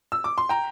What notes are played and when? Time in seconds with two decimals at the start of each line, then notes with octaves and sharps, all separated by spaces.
0.12 E6
0.24 D6
0.38 C6
0.49 G5 A#5